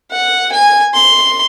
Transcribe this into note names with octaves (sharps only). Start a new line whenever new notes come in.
F#5
G#5
C6